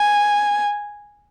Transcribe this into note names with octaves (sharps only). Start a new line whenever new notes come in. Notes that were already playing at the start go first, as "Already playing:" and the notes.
Already playing: G#5